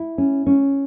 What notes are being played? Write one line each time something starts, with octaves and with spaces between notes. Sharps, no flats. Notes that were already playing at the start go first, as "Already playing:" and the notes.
Already playing: E4
C#4
C#4